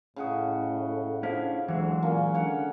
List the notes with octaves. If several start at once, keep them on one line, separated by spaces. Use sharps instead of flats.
A2 C#3 F#4 D#5
F3 C#4 D4 E4
D2 E3 F#3 G#3 F#4
A#2 A#3 C#4
D3 C#5 F#5